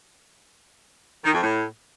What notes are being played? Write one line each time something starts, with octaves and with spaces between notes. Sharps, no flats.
D#3
F2
A2